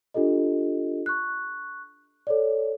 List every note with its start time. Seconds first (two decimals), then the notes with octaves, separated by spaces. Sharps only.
0.14 D4 F4 G4 A4 D#5
1.06 C#6 F#6
2.27 A4 C#5 D5